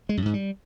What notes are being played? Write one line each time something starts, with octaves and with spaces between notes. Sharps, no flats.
G#3
F#2
G#2
G3